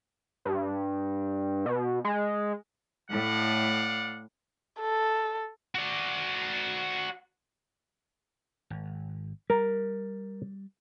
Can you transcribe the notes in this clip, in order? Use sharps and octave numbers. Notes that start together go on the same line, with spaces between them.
G2
B2
G#3
A2 D5 F5 F#5
A4
F#4 D5
G#1
G3 A#4